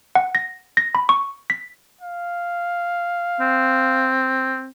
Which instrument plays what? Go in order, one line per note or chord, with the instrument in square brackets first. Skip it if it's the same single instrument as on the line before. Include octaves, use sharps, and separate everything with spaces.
[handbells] F#5
A#6
A#6
B5
C#6
B6
[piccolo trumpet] F5
[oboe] C4